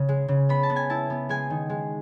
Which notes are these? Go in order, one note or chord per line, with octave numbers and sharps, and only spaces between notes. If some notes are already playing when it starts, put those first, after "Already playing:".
Already playing: C#3
G#3
C#3
B3 B5
A5
B3
G#5
E4 A5
B3
G#3 G#5
D#3
G#3